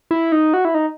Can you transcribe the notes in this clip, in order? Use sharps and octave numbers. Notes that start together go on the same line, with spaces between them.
E4
D#4
F#4
E4
D#4